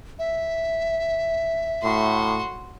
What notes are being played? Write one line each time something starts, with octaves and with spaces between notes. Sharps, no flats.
E5
A2 F#4 C6